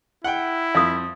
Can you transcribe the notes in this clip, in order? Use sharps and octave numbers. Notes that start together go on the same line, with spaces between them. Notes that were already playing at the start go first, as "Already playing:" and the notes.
E4 F#5 G5
F2 F5 D#6